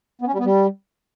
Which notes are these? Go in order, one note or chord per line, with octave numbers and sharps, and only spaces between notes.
B3
C#4
G3
B3
G3